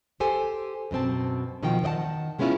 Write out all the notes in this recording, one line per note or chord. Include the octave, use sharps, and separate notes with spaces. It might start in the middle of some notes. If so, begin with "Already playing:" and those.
G4 A4 C5 G#5
F#2 B2 C4 A5
B2 D#3 F3 D#4 F#4 G5
D#3 D5 D#5 F#5 A5
D#3 G#3 B3 C#4 E4 F4